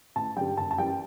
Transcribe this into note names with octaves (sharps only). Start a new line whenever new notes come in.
A1 A5
G2 D3 G3 G5
F#1 A5
A5
F#2 E3 G3 G5